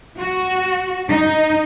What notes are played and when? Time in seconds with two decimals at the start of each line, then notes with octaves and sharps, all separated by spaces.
0.21 F#4
1.10 D#4